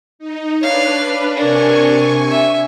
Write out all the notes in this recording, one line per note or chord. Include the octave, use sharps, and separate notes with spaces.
D#4
D4 B4 C#5 F5
C3 D4 A#4 G#5 C#6
E5